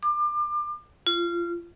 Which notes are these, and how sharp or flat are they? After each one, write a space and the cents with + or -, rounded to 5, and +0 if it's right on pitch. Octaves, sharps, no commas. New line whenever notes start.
D6 +30
F4 -25